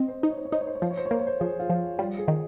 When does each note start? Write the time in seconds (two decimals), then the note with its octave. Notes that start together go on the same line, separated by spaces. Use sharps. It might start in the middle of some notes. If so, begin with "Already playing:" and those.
Already playing: C4 D#5
0.08 C5
0.22 D#4 C5
0.31 C#5
0.37 C5
0.45 C#5
0.52 D#4 C5
0.61 C#5
0.67 C5
0.75 C#5
0.82 F3 C5
0.91 C#5
0.97 C5
1.05 C#5
1.11 A#3 C5
1.19 C#5
1.27 C5
1.40 F3 G#4
1.59 F4
1.70 F3
1.98 G3 F4
2.18 G#4
2.28 D#3